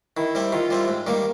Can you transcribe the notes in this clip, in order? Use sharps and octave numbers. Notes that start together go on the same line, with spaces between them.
D#3 E4
G3 C4 E4
D#3 F4
G3 C4 E4
G#2
D#3 G3 A#3